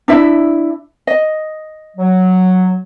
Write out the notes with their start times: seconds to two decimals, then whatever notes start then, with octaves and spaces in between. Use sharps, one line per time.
0.08 D4 E4 E5
1.07 D#5
1.96 F#3